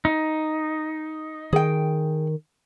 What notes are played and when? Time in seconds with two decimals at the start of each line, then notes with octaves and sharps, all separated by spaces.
0.05 D#4
1.53 D#3 G#4 G5